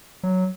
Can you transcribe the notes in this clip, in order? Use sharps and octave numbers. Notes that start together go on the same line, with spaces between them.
F#3